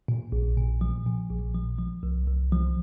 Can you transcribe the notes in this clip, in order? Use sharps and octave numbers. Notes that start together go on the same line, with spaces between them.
A#2
A#1
A#2
F3
A#2
A#1
F3
F3
C2
C2
F3